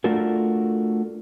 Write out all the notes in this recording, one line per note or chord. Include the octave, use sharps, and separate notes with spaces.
A3 D4 F4 F#4 A4 A#4